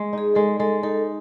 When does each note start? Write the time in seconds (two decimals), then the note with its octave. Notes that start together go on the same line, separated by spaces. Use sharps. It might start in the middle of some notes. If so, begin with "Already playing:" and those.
Already playing: G#3
0.13 D#4 G#4
0.35 G#3 A4
0.59 G#3 A4
0.83 D#4 A4